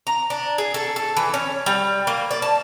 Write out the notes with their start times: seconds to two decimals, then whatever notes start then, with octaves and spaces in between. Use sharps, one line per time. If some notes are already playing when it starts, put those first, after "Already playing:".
0.07 A#5
0.30 D4
0.58 G#4
0.74 A4
0.96 A4
1.17 E3
1.34 C#4
1.66 G3
2.07 A#3
2.31 D5
2.42 A5